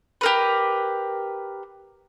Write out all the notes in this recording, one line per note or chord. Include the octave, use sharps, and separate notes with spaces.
G4 A#4 B4